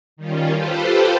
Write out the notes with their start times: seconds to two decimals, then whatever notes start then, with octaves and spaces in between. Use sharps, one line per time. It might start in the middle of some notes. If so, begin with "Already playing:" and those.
0.17 D#3 G3 C#4 F4
0.53 F4 G4 A4 B4 C5